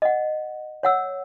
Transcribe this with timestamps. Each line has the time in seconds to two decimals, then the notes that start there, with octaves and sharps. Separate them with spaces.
0.02 D#5 F#5
0.83 C#5 F#5 E6